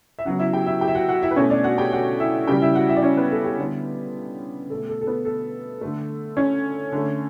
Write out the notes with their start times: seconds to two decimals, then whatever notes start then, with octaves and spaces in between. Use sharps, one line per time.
0.19 E5
0.25 C#3 F#3 B3 F#4 F#5
0.39 E4 E5
0.53 G4 G5
0.67 E4 E5
0.81 G4 G5
0.88 E5
0.95 F#4 F#5
1.09 F#4 F#5
1.23 E4 E5
1.31 B4
1.36 B2 A3 C#4 C#5
1.50 D4 D5
1.64 F#4 F#5
1.78 G4 G5
1.92 F#4 F#5
2.20 E4 E5
2.47 C#3 E3 G3 G4 G5
2.62 E4 E5
2.75 F#4 F#5
2.89 E4 E5
2.96 D5
3.03 C#4 C#5
3.17 B3 B4
3.31 A4
3.45 G4
3.59 D3 G3 B3
4.70 B2 A3 A4
4.89 A4
5.01 A4
5.07 B3 B4
5.25 A4
5.81 D3 A3
6.37 C#4 C#5
6.92 D3 A3